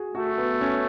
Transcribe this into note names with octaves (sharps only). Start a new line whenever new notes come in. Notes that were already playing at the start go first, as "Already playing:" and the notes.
Already playing: F#4 G#4
A3 F#4
B3
C#4